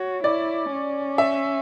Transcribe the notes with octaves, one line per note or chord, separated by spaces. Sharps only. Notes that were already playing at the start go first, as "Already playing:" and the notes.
Already playing: F#4 C#5
E4 D5
C#4
E5